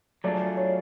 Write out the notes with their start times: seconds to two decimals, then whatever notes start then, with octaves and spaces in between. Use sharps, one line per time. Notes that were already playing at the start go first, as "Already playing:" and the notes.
0.24 F#3 A3 D4 F4 G#4 D5
0.57 C#5